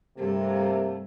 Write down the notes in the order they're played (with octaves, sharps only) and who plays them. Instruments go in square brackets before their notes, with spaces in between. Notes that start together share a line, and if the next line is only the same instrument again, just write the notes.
[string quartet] G2 A3 [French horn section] C3 A#3